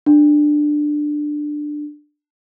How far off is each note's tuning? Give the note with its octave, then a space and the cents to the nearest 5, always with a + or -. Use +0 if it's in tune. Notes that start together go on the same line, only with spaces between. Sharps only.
D4 +15